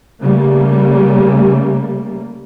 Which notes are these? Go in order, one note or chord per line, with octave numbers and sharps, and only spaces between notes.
C#3 G3 A3 A#3